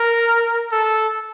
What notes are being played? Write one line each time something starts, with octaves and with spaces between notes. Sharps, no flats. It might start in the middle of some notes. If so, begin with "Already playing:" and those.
Already playing: A#4
A4